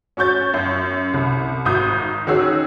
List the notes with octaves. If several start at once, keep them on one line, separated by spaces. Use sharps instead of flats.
C#4 F#4 C#6 G6 A6
F#2
C2
G#1 F#4 D#6 G6
D#3 C#4 F#4 G#4 E6